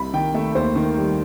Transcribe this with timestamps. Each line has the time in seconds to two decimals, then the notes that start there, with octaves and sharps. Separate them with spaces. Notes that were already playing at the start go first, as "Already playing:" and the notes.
Already playing: C2 C3 B5
0.13 D#3 G5
0.34 A3 E5
0.55 D#2 C5
0.76 D#3
0.96 G3